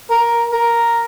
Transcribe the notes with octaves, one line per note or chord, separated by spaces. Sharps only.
A#4
A#4